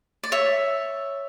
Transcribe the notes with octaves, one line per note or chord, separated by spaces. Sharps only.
D5
C#5 E5